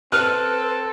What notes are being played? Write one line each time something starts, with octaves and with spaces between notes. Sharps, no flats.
C4 A4 B4 F6 F#6